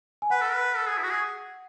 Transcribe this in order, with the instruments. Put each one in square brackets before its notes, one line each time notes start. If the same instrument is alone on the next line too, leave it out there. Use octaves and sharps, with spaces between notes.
[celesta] G#5
[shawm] B4 [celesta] F#5
[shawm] A4
B4
A4
G#4
E4
F#4
G#4